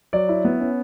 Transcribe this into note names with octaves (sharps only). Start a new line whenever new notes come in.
F#3 D5
E4
B3
C#4